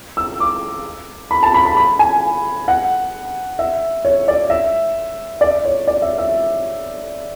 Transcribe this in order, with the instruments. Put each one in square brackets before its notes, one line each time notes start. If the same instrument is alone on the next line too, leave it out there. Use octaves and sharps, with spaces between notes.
[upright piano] E6
D6
B5
A5
B5
B5
B5
G#5
F#5
E5
C#5
D5
E5
D5
C#5
D5
E5
E5